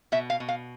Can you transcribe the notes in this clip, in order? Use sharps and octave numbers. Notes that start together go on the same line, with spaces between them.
B2 E5
F5
B2
F5